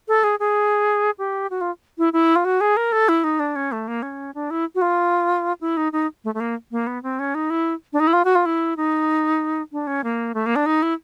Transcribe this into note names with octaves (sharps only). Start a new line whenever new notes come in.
A4
G#4
G#4
G4
F#4
F4
E4
E4
F4
F#4
G#4
A#4
A4
E4
D#4
D4
C#4
A3
A#3
C#4
D4
E4
F#4
F4
E4
D#4
D#4
A3
A3
A#3
A#3
B3
C4
C#4
D#4
E4
D4
D#4
E4
F4
F#4
F4
E4
D#4
D4
C#4
A#3
A3
A#3
D4
D#4
E4